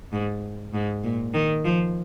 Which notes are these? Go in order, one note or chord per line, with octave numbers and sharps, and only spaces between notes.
G#2
G#2
A#2
D#3
F3